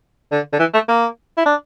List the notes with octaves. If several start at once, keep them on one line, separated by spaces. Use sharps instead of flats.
D3
D3
E3
A3
A#3
E4
D4